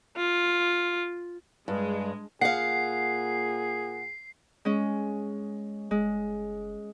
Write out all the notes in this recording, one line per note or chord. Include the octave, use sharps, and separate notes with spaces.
F4
G2 G#3
A#2 G#4 F5 F#5 C7
G#3 C#4
F#1 G#3